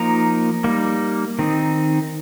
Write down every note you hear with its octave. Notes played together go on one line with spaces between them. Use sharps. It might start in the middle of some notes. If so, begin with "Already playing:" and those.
Already playing: F3 A#3 D#4 A#5
G3 A#3 D#4
D#3 C4 D#4